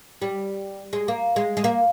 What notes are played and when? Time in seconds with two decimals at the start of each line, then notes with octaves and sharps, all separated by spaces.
0.22 G3
0.93 G#3
1.08 A#3
1.36 G#3
1.57 G#3
1.64 A#3